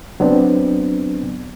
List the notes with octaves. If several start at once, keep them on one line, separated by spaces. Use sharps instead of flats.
F#3 B3 C4 D4